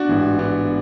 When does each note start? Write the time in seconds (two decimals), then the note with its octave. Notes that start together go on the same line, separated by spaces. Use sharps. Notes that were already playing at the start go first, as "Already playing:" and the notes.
Already playing: D4 F#4
0.09 A1 G#2 E3
0.39 B3 D4